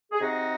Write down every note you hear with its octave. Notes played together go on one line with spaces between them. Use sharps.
G#4
C3 D#4 F#4